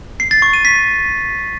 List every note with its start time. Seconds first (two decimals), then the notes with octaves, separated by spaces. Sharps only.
0.20 C7
0.31 A6
0.42 C#6
0.53 D#7
0.65 B6